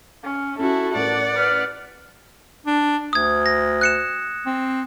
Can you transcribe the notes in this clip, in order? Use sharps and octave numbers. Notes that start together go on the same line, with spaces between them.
C#4
C#4 E4 F#4 A4
A1 A#4 D5 F#5
B4 F6
D4
D2 D#6 G#6
A#6
F#6 C#7 E7
C4